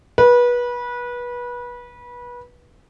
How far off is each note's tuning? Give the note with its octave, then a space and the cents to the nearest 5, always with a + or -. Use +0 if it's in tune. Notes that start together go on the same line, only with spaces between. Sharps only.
B4 -25